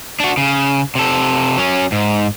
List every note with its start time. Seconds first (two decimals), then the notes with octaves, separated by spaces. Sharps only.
0.20 D4 F#4
0.37 C#3
0.95 C3 A4
1.57 F#3 C#4
1.92 G#2